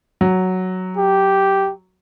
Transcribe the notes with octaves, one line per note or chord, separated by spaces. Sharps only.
F#3
G4